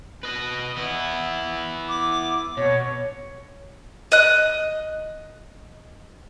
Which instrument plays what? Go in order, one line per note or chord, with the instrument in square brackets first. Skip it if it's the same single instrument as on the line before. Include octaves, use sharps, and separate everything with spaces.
[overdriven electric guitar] B4 D#5
B3 E4
[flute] D6
[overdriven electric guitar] B2 [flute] C#5
[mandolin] D#5 F#6